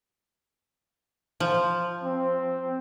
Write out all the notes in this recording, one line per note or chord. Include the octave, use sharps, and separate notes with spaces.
F3
C4